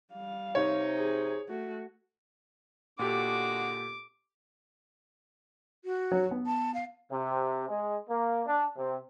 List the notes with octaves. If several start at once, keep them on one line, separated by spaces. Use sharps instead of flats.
G3 F5
C3 D#4 C#5
G#4
A3 F#4
A#2 D3 G#3 F#4 G4 A4 D6
F#4
F#3
B3
A5
F5
C3
G#3
A#3
D4
C3